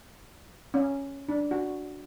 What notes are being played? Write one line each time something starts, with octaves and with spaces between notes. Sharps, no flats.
C#4
D4
F#4